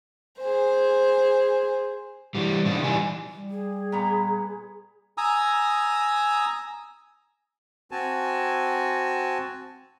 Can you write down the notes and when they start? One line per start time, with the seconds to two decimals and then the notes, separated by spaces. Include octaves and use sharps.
0.40 G#4 C5
2.35 E3 G3
2.65 C3 D4 D#4
2.83 E3 G3 G#5
3.36 G3
3.51 G#4
3.92 A#2 B3 A#5
5.18 G#5 A#5 D#6 E6
7.91 C4 F#4 G#5 A5